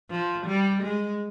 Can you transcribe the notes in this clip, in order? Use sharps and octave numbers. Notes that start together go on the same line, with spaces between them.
F3
G3
G#3